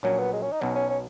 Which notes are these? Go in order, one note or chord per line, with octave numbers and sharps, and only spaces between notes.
A#1 A#2 F#3 C#4
B3
G#3
C#4
D#4
B1 B2 F#3 C#4
C#4
C#4